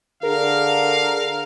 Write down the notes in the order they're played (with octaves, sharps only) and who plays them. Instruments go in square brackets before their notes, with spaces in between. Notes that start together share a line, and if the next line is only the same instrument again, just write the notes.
[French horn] D3 [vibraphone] G#4 [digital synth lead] A#4 [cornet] F5